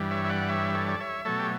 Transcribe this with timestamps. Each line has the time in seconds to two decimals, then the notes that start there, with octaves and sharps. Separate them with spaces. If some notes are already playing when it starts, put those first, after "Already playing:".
Already playing: G2 E3 G3
0.11 C#5 E5
0.25 E5
0.29 D5 F#5
0.49 C#5 E5
0.75 A4 C#5
0.88 D5
1.00 C#5 E5
1.25 B2 F#3 A3 A4 C#5
1.39 G4